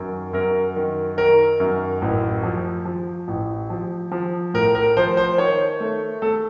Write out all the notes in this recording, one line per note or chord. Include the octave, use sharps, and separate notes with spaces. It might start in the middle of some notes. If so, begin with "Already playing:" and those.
Already playing: F#2 D#3
F#2 A#4
D#3
D#3 A#4
F#2
A1
F3
F3
A1
F3
F3
A2 A#4
A#4
F3 C5
C5
D#3 C#5
A3
A3 A4